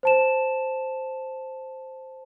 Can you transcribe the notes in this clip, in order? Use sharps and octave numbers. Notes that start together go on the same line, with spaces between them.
C5 A5 E7